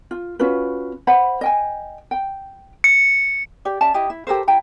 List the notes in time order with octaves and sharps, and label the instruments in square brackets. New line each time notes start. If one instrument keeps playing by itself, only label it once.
[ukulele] F4
C#4 F4 F#4 B4
C5 E5 F#5 B5
D#5 G5 G#5
G5
[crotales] C#7
[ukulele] G4 D5
C#4 D5 E5 A5
E4 G4 D#5
E4
G4 A4 A#4 C5
E4 G5 A#5